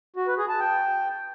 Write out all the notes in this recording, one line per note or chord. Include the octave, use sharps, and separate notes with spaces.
F#4
B4
G#4
A5
G5